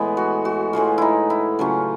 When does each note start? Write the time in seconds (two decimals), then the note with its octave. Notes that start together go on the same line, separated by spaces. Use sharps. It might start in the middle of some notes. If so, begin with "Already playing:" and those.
Already playing: A2 E3 G#3 B3
0.17 F#4
0.45 F#4
0.73 A2 E3 G#3 B3 F4
0.98 D#4 E4
1.30 E4
1.59 C#3 F#3 A3 C#4 F4